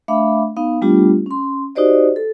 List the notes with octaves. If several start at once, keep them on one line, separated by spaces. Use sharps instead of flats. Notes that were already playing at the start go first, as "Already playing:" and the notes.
A3 D4 E5 F5 B5 D6
B3 D#4 F5
G3 A3 B3 D4 F4 G4
C#4 C6
D#4 F#4 G4 C5 D5 D#5
A4